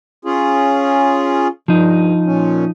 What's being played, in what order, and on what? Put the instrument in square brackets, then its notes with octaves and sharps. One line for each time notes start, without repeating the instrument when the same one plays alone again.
[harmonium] C#4 F4 G#4
[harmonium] G2 [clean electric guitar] F3 D#4
[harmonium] A#2 C#4